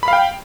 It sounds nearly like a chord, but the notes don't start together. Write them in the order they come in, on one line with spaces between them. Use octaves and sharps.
B5 F5 G5